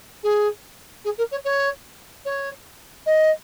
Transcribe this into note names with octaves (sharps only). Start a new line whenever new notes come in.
G#4
G#4
A#4
C#5
C#5
C#5
D#5